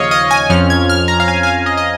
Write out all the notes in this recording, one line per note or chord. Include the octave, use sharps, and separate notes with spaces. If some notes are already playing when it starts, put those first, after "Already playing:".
Already playing: D#2 C#3 F3 C#5 D#5 F5
D#5
G#5
F2 F3 C#4 F6
G#6
F6
A#5
F5
G#5
G#5
F5
D#5
D#5